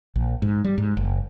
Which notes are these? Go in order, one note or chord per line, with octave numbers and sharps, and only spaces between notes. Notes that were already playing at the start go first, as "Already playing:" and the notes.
A#1
G#2
G3
G#2
F#1